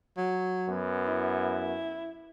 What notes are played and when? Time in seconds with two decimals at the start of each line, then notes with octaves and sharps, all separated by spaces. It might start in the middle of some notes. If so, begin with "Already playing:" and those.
0.17 F#3
0.68 F#2 B3
1.07 E4